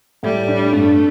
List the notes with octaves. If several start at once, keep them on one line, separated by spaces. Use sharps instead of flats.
A2 G3
D4
G2 A3